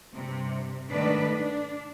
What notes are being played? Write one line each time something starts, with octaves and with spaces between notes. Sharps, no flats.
G2 C3
G#2 D#3 A3 D4 B4 D5
D4